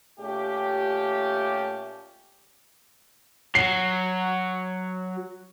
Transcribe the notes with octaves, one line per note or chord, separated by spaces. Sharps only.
A#2 A3 C#4 G4
F#3 C7